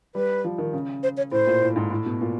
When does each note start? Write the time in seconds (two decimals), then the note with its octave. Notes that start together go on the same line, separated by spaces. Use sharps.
0.15 G3 B4
0.44 F3
0.58 D#3
0.73 C#3
1.03 C5
1.17 C#5
1.32 A2 C5
1.47 A#2
1.62 A2
1.76 G#2
1.91 A2
2.06 B2
2.21 A#2